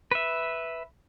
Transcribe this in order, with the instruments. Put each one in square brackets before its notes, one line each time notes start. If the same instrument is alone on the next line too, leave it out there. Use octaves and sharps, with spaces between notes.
[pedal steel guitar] B4 E5